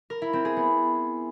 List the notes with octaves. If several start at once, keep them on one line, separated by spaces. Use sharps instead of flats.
A#4
E4
C4
G#4
B3